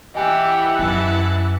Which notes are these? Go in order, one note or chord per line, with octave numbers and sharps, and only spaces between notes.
E3 G4 D#5 E5 F#5 G#5
F#2 E4 A5